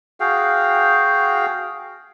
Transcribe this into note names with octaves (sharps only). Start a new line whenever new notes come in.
F#4 G#4 F5 G5